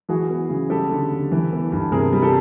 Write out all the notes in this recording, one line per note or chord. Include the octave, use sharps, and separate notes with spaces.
E3 F#4 G#4
B3
C#3
G3 G4 A4
D3
D3
E3
B3
G2
C3 G#4 A#4
G3
G4 A4